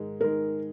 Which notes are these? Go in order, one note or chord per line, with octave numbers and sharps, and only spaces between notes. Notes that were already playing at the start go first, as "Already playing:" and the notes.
Already playing: G#2 D#3 G#3
G#2 D#3 G#3 A#4